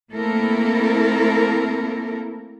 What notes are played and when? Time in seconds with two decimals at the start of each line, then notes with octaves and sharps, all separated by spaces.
0.13 A3 A#3 C4 E4 A4 A#4